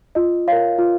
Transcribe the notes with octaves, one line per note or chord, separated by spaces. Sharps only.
F4 D#5
A#4 C#5 F5
F4